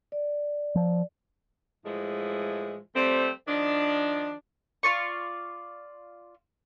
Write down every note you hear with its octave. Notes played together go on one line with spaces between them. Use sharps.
D5
F3
A2 E3 F3 G#3
F3 G3 A3 C4
D#3 F3 D4
F4 D5 C#6